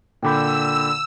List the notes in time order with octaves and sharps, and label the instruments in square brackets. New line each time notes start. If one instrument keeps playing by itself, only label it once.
[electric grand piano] A#2 D3 B5 [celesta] G5 D6 G6 [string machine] E6